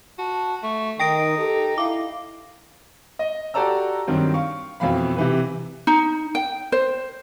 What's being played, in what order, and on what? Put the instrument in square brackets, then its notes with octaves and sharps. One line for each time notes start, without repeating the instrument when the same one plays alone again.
[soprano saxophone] F#4 [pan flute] A5
[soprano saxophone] A3 [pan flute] C#6
[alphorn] D#3 [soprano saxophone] D#4 [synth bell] G5 A#6 D7 [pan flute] D#6
[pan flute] G4 [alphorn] A4
[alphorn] E4 [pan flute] F5 [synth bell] D6
[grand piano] D#5
F#4 G4 A4 D5 A#5 E6
G2 D#3 F#3 C4
F5 C#6
F2 B2 E3 F5 B5
C3 E3 B4
[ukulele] D#4
G5
C5